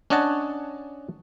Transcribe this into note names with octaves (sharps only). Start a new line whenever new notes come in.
C#4 D4 C#5 D#5 F#5 A5